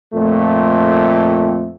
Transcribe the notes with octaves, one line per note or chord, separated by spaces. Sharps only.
F2 A#2 A3